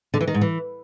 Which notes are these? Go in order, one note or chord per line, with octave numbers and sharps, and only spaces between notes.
D3
E3
D#3
G#2
E3